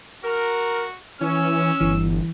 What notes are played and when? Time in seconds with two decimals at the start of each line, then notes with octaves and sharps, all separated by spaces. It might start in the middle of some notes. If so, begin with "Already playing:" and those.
0.24 F#4 A#4
1.21 E3 C#4 E6
1.81 G1 E3